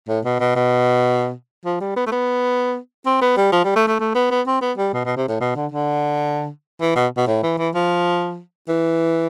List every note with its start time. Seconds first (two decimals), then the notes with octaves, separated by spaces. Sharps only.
0.09 A2
0.25 B2
0.40 B2
0.55 B2
1.65 F3
1.81 G3
1.96 B3
2.06 A3
2.12 B3
3.06 C4
3.21 B3
3.37 G3
3.52 F3
3.64 G3
3.76 A3
3.88 A3
4.00 A3
4.15 B3
4.30 B3
4.47 C4
4.61 B3
4.77 G3
4.93 B2
5.05 B2
5.16 C3
5.28 A2
5.40 B2
5.56 D3
5.72 D3
6.81 E3
6.96 B2
7.17 B2
7.27 A2
7.43 E3
7.59 E3
7.74 F3
8.68 E3